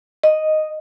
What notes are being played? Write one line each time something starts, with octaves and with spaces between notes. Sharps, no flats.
D#5